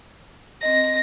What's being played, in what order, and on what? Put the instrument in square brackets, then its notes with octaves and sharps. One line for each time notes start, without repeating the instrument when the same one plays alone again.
[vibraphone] C4 D#5 [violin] A#6